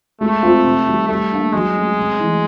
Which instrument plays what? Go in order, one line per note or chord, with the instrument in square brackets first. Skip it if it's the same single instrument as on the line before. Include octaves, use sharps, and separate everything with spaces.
[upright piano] G#3 [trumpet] A3
[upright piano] C4 F4
C3
D#3 G3
[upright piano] G3 [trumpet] A3
[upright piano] A#3 D4
[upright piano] F#3 [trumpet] G#3
[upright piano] A3 C#4 F#4
C3
E3 A3